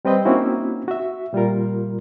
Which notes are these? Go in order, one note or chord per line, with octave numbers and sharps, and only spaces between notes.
G3 C4 B4 D#5 G5
A#3 C4 C#4 D#4 E4 F#4
F#4 E5
A#2 G3 F4 A#4